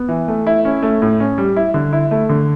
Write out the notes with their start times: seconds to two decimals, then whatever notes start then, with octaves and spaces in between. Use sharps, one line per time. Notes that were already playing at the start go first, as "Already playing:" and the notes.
Already playing: B3
0.09 E3
0.28 A3
0.47 E4
0.65 C#4
0.83 A3
1.02 A2
1.20 C#4
1.38 G3
1.56 E4
1.74 D3
1.93 E4
2.11 A3
2.29 D3